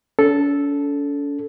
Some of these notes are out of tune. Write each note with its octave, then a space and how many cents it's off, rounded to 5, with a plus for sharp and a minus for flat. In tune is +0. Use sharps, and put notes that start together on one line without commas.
C#4 +45 A4 -5